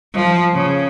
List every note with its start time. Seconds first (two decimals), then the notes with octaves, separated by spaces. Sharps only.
0.15 F3
0.53 C#3